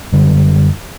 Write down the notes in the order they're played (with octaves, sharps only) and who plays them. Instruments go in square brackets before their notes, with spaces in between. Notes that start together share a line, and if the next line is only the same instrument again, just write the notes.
[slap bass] F#2 D3 G3